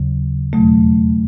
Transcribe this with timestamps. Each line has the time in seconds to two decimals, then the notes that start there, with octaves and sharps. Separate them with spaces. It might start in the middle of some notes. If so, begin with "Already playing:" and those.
Already playing: D#2 C#3 F#3
0.53 E2 B2 F#3 A3